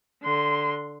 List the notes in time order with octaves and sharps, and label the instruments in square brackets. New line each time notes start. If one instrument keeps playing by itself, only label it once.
[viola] D3 C6